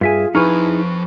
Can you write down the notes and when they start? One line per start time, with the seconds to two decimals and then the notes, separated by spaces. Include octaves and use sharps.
0.01 G2 F4 G#4 E5 G#5
0.35 F2 D#4 E4 G#4 B4 G#5 C#6 F6